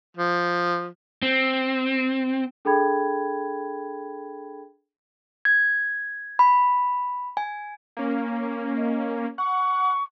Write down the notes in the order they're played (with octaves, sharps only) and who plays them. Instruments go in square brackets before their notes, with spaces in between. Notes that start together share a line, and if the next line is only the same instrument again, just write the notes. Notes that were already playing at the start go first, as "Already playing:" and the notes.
[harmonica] F3
[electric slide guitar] C4
[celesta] D4 G#4 A4 G5 B5 G#6
[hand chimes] G#6
B5
G#5
[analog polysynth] A#3 C#4
[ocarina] D#5
[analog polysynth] F#5 [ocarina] C#6